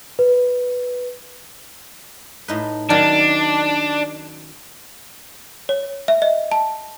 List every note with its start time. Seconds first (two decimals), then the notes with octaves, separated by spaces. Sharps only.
0.19 B4
2.48 A2 D#4 B4
2.90 D#3 F#3 C#4 D4
5.69 C#5
6.08 E5
6.22 D#5
6.52 A5